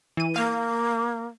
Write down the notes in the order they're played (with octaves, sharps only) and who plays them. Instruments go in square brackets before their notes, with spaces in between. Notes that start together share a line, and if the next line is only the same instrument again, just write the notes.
[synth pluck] E3 D#7
[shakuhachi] A#3 [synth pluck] F5